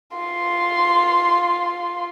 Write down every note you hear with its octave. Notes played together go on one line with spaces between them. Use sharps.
F4 C6